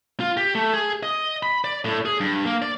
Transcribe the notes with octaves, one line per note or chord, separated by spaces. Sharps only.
F4
G4
A3
G#4
D#5
B5
D5
A2
G#4
G2
A#3
D5